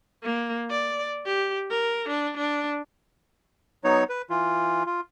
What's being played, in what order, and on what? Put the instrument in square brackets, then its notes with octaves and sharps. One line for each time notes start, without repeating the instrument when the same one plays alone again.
[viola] A#3
D5
G4
A#4
D4
D4
[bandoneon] F#3 B3 D#4 C#5
B4
E3 F4
F4